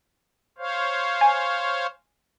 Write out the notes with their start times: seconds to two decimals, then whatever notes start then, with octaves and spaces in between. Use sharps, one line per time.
0.58 C5 C#5 F5
1.21 G#5